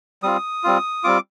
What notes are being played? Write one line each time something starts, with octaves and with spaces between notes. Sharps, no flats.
G3 C4 F4 D#6
G3 C4 F4
G3 C4 F4 D6